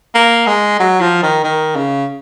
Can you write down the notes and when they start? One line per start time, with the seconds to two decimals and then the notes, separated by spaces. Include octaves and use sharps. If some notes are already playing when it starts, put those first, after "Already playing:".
0.15 A#3
0.47 G#3
0.80 F#3
1.01 F3
1.23 D#3
1.44 D#3
1.76 C#3